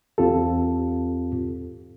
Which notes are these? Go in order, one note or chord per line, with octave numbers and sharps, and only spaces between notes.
E2 C4 F4 G4 A4